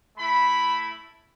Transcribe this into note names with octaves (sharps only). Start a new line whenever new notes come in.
A3 E4 B5